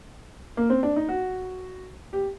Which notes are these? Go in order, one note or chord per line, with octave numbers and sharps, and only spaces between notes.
A#3
C4
D4
D#4
F#4
G4